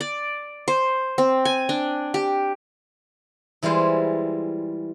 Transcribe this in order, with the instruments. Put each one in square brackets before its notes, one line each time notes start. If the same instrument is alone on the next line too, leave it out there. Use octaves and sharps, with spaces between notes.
[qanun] D5
C5
C4
G#5
D4
G4
[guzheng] E3 G3 G#3 F4 C5